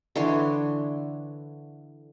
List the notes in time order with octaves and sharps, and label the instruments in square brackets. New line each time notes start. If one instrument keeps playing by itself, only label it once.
[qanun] D3 E3 C#5 C6